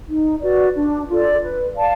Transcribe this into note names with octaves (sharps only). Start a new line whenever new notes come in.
D#4
F#4 B4 D5
D4
F4 A4 D5
B4
D5 F5 A5